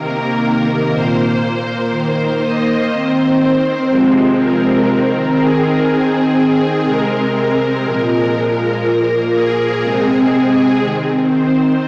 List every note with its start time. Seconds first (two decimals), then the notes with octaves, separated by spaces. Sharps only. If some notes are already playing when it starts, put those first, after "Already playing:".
Already playing: C3 D#3 A#3 A#4
0.92 A#2 A#3 C5
1.41 C5
1.90 D#3 A#3
2.40 D#5
2.90 D#3 C4 C5
3.88 C3 F3 G#3 C4
4.37 A#4
4.88 D#3 C4
5.36 G#4
5.87 D#3 C4
6.85 C3 G#3 C4 A#4
7.34 A#4
7.83 A#2 F3 G#3 A#4
8.33 A#4
8.83 A#2 F3 A#3 A#4
9.32 G#4
9.81 C3 G#3 C4
10.81 D#3 C4
11.30 C5